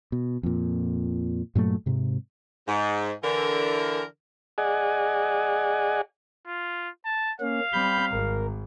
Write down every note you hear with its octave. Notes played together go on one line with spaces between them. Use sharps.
B2
F2 A#2
G2 A#2 F#3 A3
G#2 C3
G#2
D3 E3 A#4
G#4 D5 D#5 F#5 G#5
F4
A5
A#3 C#4 F5
G3 C4 B5 G6
G#1 A#4